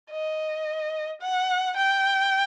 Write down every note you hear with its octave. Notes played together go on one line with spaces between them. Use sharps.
D#5
F#5
G5